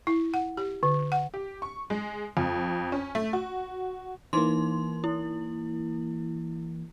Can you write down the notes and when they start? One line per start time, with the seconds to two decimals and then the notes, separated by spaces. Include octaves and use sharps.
0.07 E4
0.34 F#5
0.57 G4
0.83 D3
1.12 F#5
1.34 G4
1.62 C#6
1.90 G#3
2.37 F2
2.92 C#4
3.15 A3
3.33 F#4
4.33 E3 A#3 D#4 C6
5.04 E4